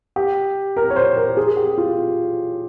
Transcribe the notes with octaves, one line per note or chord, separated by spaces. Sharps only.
G4
A#4
C#5
C5
A#4
G#4
G4
F4